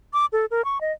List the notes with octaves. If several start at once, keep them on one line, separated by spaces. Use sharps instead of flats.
D6
A4
A#4
C#6
D#5